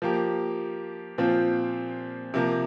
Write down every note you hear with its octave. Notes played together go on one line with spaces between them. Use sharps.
F3 A#3 G4
A#2 F3 C4 F4
C3 F3 A#3